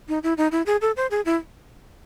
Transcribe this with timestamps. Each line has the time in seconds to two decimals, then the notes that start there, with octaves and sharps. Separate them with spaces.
0.09 D#4
0.23 E4
0.37 D#4
0.52 E4
0.66 G#4
0.81 A4
0.96 C5
1.11 G#4
1.25 E4